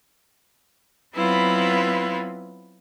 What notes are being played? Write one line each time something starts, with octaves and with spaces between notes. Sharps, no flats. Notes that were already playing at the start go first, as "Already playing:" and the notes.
F#3 B3 C4 E4 F4 B4